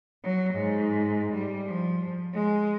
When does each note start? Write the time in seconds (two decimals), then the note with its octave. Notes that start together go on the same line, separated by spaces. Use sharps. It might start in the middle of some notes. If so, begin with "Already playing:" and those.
0.24 F#3
0.54 G#2
1.33 G3
1.66 F3
2.34 G#3